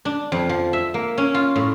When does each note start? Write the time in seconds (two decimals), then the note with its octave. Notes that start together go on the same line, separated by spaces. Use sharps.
0.05 D4
0.32 F2
0.49 F3
0.73 E5
0.94 A#3
1.18 C#4
1.34 F4
1.56 A2